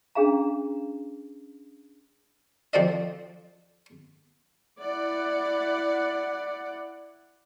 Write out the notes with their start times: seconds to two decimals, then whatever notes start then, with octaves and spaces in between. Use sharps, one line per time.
0.15 C#4 D4 G#4 F5 A#5
2.73 F3 C4 A4 D5 D#5
4.81 E4 D5 F#5